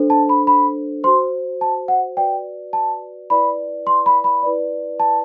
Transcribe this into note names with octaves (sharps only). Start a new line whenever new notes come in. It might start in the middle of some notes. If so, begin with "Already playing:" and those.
Already playing: D4 A4 C5
A5
B5
B5
F#4 C5 C6
A5
F#5
F#4 B4 D5 G5
A5
E4 B4 D5 B5
C6
B5
B5
E4 B4 D5
A5